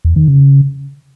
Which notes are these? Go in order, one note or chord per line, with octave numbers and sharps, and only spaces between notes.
E2
D#3
C#3